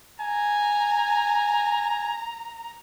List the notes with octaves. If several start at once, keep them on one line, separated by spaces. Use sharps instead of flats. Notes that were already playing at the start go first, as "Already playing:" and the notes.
G#5 A#5